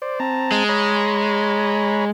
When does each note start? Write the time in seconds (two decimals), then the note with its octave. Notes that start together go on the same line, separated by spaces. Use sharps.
0.02 C5 D5
0.20 C4 A5 A#5
0.52 G#3
0.69 C#5 A#5 B5